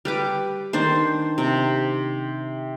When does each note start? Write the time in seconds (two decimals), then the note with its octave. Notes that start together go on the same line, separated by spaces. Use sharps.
0.05 G3 B4 D6
0.73 D#3 D4 C5
1.38 C3